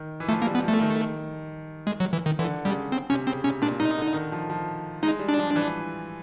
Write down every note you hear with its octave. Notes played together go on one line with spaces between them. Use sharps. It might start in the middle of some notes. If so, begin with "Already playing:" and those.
Already playing: D#3
E3
F3 A3
A#3
G3
B3
F3 A3
D#3
G#3
F#3
E3
D#3
D3 E3
C#3 G3
C4
C3 C#4
C#3 C4
C3 C#4
A#2 D4
A#2 D#4
D3
D#3
F3
F3
G#3 D#4
G3
D4
F3
E3